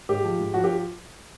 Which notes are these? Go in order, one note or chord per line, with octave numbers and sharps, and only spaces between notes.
G#2 G4
F3
G#2
F3 F#4
G4